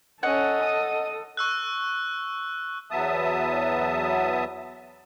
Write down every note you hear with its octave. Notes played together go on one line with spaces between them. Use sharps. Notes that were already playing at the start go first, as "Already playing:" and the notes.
C#4 A4 D#5 F#5
D#6
C#6 E6 F#6
E2 F#3 B3 E5 A5 D#6